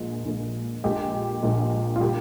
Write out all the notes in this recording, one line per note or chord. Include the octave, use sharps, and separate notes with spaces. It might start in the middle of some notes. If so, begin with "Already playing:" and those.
Already playing: A#1 A#2 G#3
A#1 A#2 G#3
A#1 A#2 G#3 G4
A#1 A#2 G#3
F4
A#2 G3 G4